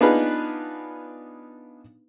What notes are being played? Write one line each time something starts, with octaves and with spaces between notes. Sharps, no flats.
B3 D4 D#4 F4 G#4 B4